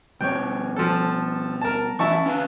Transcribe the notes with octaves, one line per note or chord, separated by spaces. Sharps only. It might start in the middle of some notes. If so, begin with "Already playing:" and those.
B2 G3 C#5 G5
F3 A4
A#4 A5
E3 C#4 E4 A5 C#6
C#4 B4 F5